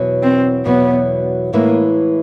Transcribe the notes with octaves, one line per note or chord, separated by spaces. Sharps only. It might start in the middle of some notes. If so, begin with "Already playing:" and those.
Already playing: E2 B2 F#3
C4
E2 B2 F#3 B3
A2 E3 G#3 A#3 B3 E4